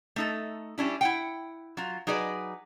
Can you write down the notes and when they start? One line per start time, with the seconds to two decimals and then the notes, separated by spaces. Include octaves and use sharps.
0.16 A3 D#4 A4
0.78 G3 C#4 D4 E4
1.01 E4 F#5 G5
1.77 F#3 F4
2.07 F#3 D#4 G#4 B4 D5